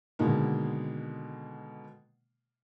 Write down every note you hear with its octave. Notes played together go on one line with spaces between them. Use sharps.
B2 D3 D#3 G#3 A#3